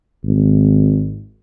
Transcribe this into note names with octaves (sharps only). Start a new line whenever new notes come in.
G#1